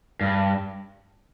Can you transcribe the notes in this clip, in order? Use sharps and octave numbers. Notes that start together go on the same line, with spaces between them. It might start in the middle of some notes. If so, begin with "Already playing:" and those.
G2